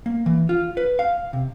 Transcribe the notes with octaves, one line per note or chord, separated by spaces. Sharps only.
A#3
E3
F4
B4
F5
C3